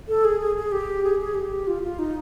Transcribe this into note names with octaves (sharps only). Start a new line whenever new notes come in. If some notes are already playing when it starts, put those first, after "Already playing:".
A4
G#4
G#4
G#4
G4
G#4
G#4
G4
F4
F4
D#4